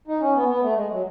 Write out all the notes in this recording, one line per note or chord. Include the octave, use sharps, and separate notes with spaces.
D#4
C#4
B3
B3
A3
G#3
F#3